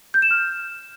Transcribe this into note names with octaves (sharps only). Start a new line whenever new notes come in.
G6
E7
F6